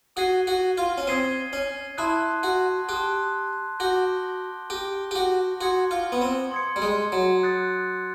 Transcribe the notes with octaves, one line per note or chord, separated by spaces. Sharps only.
F#4 D#6 G#6 C7 D#7 G7
F#4
F4
C#4
C4 D#6 G#6 C7 D#7 G7
C#4
E4 A5 C6 D#6 F#6
F#4
G4 A5 C6 D#6 F#6
F#4 D6 G6 A#6 D7 G7
G4 D6 G6 A#6 D7 G7
G4
F#4
F#4 C6 D#6 G#6 C#7
F4
B3
C4
C6 D#6 G#6 C#7
G3
G#3
F#3
D#6 F#6 A6 C#7